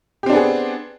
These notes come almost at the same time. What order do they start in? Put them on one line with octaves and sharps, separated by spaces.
G4 C4 D4 B3 G#4